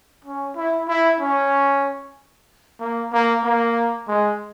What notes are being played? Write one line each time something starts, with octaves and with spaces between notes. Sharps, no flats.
C#4
E4
E4
C#4
A#3
A#3
A#3
G#3